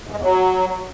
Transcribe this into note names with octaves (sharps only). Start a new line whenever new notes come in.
G#2
G#3
E2
F#3